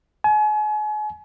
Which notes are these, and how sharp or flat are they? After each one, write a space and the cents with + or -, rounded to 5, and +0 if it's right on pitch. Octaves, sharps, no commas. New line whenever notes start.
G#5 +35